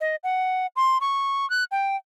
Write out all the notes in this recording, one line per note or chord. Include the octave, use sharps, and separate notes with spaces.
D#5
F#5
C6
C#6
F#6
G5